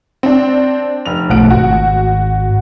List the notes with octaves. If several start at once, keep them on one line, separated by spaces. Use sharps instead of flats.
C4 D4
F1 F7
B1 F3 A3 F#5 D7
G#1 F#4